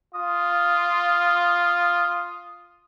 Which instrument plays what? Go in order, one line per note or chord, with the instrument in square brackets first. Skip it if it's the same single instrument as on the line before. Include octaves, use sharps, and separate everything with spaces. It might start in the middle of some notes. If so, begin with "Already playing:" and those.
[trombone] F4 [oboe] D#6